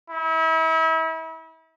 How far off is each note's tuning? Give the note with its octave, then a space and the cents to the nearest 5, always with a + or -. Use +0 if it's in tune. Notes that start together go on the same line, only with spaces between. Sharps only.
E4 -35